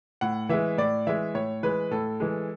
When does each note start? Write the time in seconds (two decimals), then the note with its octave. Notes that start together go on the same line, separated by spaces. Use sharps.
0.21 A2 F#5
0.49 E3 G#3 E5
0.78 A2 D5
1.07 E3 G#3 E5
1.34 A2 C#5
1.63 E3 G#3 B4
1.91 A2 A4
2.20 E3 G#3